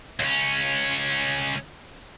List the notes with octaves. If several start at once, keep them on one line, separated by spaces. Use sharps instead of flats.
C#2 C#4